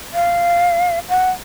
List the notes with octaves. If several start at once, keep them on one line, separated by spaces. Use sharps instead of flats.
F5
F#5